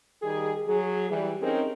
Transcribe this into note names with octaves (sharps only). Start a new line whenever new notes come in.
D#3 G3 G#4
F#3 G#4
E3 G3
C4 C#4 D#4 G#4 A#4